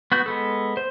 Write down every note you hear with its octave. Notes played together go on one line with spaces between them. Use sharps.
B3 F#4 G6
G#3 B3 A4
C5